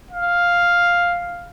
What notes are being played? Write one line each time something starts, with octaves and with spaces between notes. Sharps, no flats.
F5